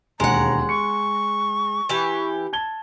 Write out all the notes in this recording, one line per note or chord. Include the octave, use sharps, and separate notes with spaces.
E1 D#2 G#3 F#5 A#5
C#6 C#7
E3 G4
A5 G#6 G7